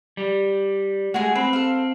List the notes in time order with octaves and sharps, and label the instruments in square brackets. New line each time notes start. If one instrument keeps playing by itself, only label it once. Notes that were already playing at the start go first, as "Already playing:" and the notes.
[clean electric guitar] G3
[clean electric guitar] G#3 A3 [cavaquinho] F#4 G#5
[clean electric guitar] C4 [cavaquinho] B4
[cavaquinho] A4 F5